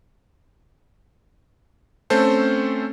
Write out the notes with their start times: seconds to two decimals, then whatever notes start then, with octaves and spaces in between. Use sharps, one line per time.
2.10 A3 C4 C#4 A4 C5